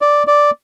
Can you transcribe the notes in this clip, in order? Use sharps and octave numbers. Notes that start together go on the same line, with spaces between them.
D5
D5